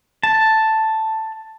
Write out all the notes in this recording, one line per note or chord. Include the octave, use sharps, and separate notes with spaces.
A5